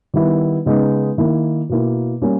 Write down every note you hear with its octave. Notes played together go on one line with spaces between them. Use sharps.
D#3 G3 B3 E4
C#3 G#3 B3 D#4
D#3 A#3 E4
B2 A#3 E4
G3 A#3 C#4